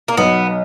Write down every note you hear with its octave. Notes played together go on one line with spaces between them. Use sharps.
A#3
B1 B3